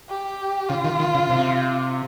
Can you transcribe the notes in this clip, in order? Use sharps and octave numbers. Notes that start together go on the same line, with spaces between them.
G4
C#3 F4
D#3
D#3
C#3
C3